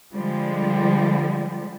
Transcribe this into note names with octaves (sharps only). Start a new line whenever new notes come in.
D3 F3 G3 G#3